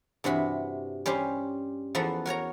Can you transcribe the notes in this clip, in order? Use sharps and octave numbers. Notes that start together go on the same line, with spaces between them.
G2 C3 E3 F#4 B5
G3 C#4 G4 C5
E2 F3 A4 B4 F#5 A#5
F#4 A#4 C#5 A#5